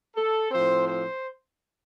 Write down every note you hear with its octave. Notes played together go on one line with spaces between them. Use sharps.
A4
A2 F3 C4 C5
C5